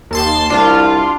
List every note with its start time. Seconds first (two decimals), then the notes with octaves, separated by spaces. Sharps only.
0.11 D#2 A5 C6
0.50 C2 D4 F4